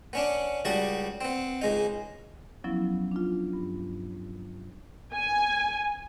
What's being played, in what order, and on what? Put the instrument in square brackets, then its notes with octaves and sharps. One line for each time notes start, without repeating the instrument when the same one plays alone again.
[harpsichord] B3 C#4 D4
C#2 G3 F#4 A5 D#6
B3 C4
C#2 G#3 D#4
[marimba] F3 F#3 B3 C#4 E4
D4 F4
G2
[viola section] G#5